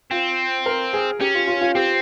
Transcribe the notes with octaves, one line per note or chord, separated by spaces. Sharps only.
C4 F4
A#4
G#4
C#4 G4
F4
F4
F4
C4 G4